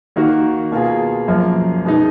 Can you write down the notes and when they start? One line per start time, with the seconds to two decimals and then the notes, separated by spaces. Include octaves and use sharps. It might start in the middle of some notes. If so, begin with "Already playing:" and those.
0.16 D#3 A#3 D#4 F#4
0.72 B2 A#3 F4 G#4
1.28 F#2 F3 A#3
1.85 B2 G#3 D#4